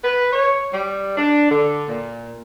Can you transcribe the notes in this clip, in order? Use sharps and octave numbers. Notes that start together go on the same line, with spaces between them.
B4
C#5
G3
D4
D3
A#2